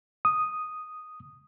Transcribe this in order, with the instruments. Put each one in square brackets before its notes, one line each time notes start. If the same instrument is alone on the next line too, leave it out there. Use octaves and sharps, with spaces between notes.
[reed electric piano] D#6